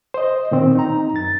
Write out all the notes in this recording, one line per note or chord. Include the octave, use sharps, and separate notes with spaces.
C5 D#5
A#2 D#3 C4
D#4 A#5
F#2 A6